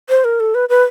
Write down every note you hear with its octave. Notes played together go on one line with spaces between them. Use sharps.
C5
A#4
A4
B4
B4